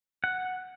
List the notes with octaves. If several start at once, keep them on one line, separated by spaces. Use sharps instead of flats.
F#5